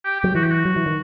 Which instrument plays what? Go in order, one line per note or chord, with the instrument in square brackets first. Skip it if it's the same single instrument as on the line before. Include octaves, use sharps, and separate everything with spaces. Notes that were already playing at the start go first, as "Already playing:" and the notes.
[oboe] G4
[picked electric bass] F#3 [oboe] G4
[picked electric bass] E3 [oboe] F#4
[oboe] G4
F#4
[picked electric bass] F#3
E3
D#3